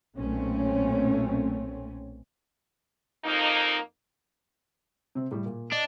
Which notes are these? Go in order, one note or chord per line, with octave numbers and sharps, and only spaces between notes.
B1 A#2 A3 C4 C#4
F2 A#3 D#4
C3 C4
A2 G3
A#2
D4 D#5